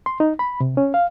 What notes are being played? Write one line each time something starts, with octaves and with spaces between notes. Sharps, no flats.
C6
D#4
B5
C3
C#4
F5